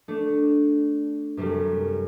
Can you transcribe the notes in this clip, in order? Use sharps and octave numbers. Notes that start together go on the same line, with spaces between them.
A3 D4
F#2 C3 G3 A3